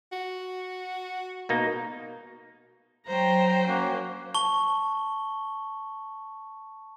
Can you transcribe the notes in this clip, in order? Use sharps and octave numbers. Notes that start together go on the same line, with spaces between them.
F#4
B2 A#3 D#4
F#3 C5 G5 A#5
A#3 C#4 F#4
A5 C#6 G7